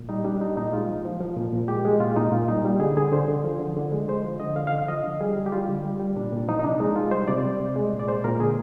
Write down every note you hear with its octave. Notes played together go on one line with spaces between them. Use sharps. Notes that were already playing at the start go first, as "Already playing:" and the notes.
Already playing: A#2
G3 D#4
G3 D4
G3 D#4
A#2 D#4
G#3 F4
F3
F3
F3
A#2
A#2
G#3 G4
G#3
A#2 F4
A#2 D#4
A#2 F4
G3 D#4
G3
D3 G#4
D3 G#4
D3 C5
D3
F3
D3
D3
G#3
G#3 C5
F3
D3 D#5
D3 F5
F5
D3
F5
F3 D#5
D3
G3 G#4
G3
G4
G3 F4
D3
G3
G3
A#2 D4
A#2
F3 D#4
D#4
C3 D4
G#3 D#4
G#3 F4
G3 C5
C3 D5
G3
C3
G#3
A#2
D5
G#3 C5
A#2 A#4
D3 G#4